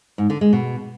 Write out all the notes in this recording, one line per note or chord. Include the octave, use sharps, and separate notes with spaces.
G#2
D3
G#3
B2